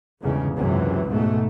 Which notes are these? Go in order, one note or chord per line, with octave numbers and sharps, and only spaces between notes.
G1 E2 G#2 C#3
C#2 F#2 C3 E3
G#2 B2 A3